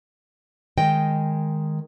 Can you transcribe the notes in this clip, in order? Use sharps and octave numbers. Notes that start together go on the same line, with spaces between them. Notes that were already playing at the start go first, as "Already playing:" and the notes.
D#3 G#3 D#5 G5